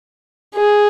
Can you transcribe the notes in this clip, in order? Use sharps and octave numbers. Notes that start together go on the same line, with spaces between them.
G#4